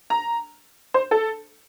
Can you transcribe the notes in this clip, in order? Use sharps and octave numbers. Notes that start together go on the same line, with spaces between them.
A#5
C5
A4